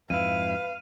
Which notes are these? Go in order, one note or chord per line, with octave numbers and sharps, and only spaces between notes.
F2 G#2 E4 B4 F5 D#7